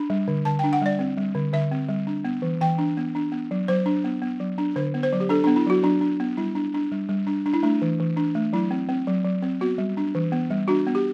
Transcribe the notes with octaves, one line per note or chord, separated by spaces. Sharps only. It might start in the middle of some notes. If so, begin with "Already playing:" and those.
Already playing: D4 B5
G3
D3
D3 A5
D4 G5
F#5
G3 D5
C4
G3
D3
D3 E5
C4
G3
D4
B3
E3
E3 G5
D4
B3
D4
B3
F#3
F#3 C5
D4
B3
B3
F#3
D4
D3 C5
B3
C5
F#3
G4
D4 A4
B3 D4
E4
F#3 F#4
F#3 D4
D4
B3
G3 E4
D4
D4
G3
G3
D4
D4
E4
A3 D4
E3
E3
D4
A3
F#3 E4
C4
C4
F#3
F#3
C4
B3 F#4
G3
D4
E3
B3
G3
D4 F#4
B3
G4